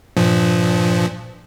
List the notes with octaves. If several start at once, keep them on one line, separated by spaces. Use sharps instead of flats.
G2 A#2 F3